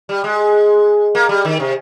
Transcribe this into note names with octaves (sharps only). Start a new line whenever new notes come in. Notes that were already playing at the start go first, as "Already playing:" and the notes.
G3
G#3
A#3
G3
D#3
C3